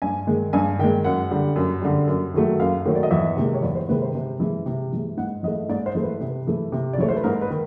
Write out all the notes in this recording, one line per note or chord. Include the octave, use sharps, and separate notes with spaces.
G2 G#5
D#3 G#3
G2 G#5
D#3 G#3 G5
F#2 F#5
D3 G3
F#2
D3 G3
F#2
D#3 F#3 A3
F#2 F5
D#3 F#3 A3 C#5
D5
D#5
E2 E5
C3 D#3 G#3
C#5
E2 D5
C5
C3 D#3 G#3 B4
C5
C3
E3 G#3
C3
E3 G#3
G#2 F#5
E3 A3 D#5
G#2 D5
C5
E3 A3
B4
C3
E3 A3
C3
D5
E3 A3 C#5
C5
B4
G#2 A#4
B4
D#3